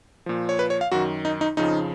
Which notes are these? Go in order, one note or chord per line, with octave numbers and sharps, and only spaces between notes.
A#2 F3
C#5
B4
C#5
F5
F#2 D#3 F#4
D#4
D#4
F2 C#3 F3 D#4